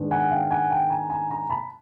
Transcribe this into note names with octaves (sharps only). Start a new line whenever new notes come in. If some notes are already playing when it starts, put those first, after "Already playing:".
Already playing: G#2 D#3 G#3 B3 D4
F#5 G#5
F5 G5
F#5 G#5
G5 A5
G#5 A#5
G#5 A#5
G#5 A#5
A5 B5